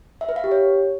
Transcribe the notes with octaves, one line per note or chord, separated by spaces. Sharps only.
E5
B4
F5
G4
C#5